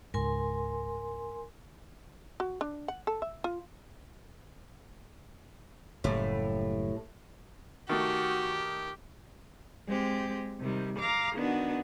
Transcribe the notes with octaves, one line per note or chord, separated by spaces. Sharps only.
C#2 G#2 A#4 G#5 C6
F#4
D4
F#5
A4
E5
F4
F#1 A2 G3
D#3 A3 F#4 G4
G#3 C4 G4
C3 D#3 G3
F5 A#5 D6
D#3 B3 D4 F#4